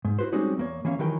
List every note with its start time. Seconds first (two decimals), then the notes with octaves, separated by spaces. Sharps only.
0.05 G#2
0.19 E4 F#4 B4 C5
0.32 G3 G#3 C4 C#4 D#4 F#4
0.57 E2 A#3 C#5
0.85 E3 A#3 C#4 F5
0.99 D#3 E3 F#3 A#4 G5